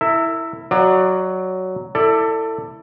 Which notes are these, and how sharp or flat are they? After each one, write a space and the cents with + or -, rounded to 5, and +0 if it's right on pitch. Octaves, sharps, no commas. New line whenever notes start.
E4 +0 A#4 -40 E5 +0
F#3 +5 D5 +30 F5 +0
E4 +0 A4 +25 D5 +10